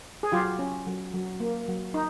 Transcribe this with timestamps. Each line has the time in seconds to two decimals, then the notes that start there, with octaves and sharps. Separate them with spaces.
0.23 G#4
0.32 F#3 F4 G4
0.59 C#4
0.87 F#3
1.14 F#3
1.40 A#3
1.68 F#3
1.94 D#4